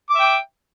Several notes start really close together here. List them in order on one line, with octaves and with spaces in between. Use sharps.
D6 E5 G5